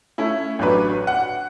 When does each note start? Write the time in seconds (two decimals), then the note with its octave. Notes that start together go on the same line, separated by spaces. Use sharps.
0.18 A3 C#4 E4
0.59 A1 F#3 D4 B4
1.07 F#5